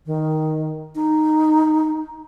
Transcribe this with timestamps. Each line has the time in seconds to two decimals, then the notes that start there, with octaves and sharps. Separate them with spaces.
0.06 D#3
0.95 D#4